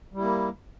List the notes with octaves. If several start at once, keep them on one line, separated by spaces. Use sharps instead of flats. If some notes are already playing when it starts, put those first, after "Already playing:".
G3 A#3 E4